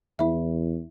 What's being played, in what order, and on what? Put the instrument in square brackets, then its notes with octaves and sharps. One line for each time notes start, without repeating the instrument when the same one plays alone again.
[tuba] E2 [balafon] E4 E5